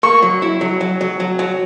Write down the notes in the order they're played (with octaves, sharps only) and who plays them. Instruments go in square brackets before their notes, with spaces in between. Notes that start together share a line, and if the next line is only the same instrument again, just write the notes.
[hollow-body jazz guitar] A#3 [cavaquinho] C#6
[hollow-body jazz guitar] F#3
E4
F#3
F#3
F#3
F#3
F#3